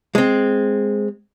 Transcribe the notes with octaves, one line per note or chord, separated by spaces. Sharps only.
G#3 C4